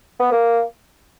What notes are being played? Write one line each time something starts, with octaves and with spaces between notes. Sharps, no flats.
B3
A#3